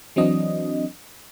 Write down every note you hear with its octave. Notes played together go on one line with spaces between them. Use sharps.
E3 F#3 C4 D4 D#5